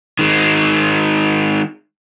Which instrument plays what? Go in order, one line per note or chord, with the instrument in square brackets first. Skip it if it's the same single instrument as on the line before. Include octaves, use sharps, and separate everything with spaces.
[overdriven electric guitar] D#3 G#3